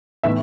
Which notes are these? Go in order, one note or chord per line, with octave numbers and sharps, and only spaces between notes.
A2 E3 B3 D#4 E5